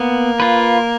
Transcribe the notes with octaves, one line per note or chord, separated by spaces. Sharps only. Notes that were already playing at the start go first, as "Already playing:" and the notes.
Already playing: A#3 B3
F4 B4